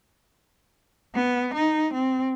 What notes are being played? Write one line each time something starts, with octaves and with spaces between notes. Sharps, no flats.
B3
D#4
C4